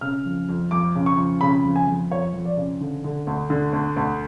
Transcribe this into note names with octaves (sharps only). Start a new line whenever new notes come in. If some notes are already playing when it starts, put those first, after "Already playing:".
C#3 F6
F2
F2
F2 D6
C#3
C#6
F2
C#3 B5
F2
G#5
F2
F2 C#5
F2
D5
C#3
D3
D3
D2
D3
D2
D2